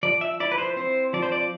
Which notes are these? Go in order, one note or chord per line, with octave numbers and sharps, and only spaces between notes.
F3 D5
E5
E4 D5
B4
C5
C4 C5
F3 D5
C5
D5